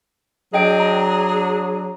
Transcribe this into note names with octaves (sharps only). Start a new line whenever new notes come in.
F#3 D4 G#4 D#5 G5 D7
A#5